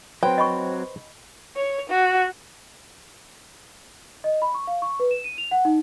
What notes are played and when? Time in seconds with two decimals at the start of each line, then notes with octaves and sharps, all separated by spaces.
0.23 F#3 C4 B4 C5 G5
0.38 D#5 B5 C#6
1.56 C#5
1.90 F#4
4.24 D#5
4.42 B5
4.54 C#6
4.67 F5
4.82 C#6
5.00 B4
5.11 E7
5.24 D#7
5.38 F7
5.51 F#5
5.65 D#4